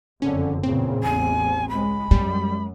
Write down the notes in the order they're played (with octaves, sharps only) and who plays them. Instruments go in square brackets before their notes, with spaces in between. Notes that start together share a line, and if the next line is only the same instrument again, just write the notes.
[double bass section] F#1 F2 D3 [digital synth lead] C#4
[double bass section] E2 A#2 C#3 [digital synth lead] C4
[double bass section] A1 E2 [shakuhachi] G#5
[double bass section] C#2 G#3 [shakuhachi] B5
[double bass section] F#2 [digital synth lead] G3 [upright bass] G#3